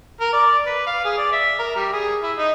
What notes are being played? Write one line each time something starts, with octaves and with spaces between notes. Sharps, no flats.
A#4
D5
B4
F5
G#4
D5
E5
A#4
G3
G#4
E4
D#4